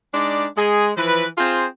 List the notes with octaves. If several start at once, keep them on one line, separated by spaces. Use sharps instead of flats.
G#3 D4 D#4 D5
G#3 G#4
E3 F3 B4
C4 F4 G#4 C5